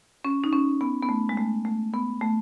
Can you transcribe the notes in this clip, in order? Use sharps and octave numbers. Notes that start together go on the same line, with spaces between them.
C#4
D#4
C#4
B3
B3
A3
G#3
A3
A3
B3
A3